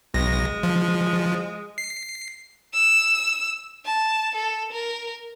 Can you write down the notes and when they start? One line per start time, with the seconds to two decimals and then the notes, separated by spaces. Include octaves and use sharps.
0.14 B1 G#3 A#6
0.63 F3
1.78 C7
2.73 E6
3.85 A5
4.35 A4
4.72 A#4